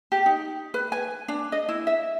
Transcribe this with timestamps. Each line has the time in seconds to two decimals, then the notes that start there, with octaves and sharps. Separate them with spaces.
0.12 G4
0.26 D#4
0.74 B4
0.92 G#5
1.28 D4
1.52 D#5
1.69 E4
1.87 E5